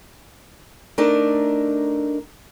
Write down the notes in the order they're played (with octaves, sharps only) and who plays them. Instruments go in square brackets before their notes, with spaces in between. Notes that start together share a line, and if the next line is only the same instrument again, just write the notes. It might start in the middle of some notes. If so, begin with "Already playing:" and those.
[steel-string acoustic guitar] A3 D4 D#4 A#4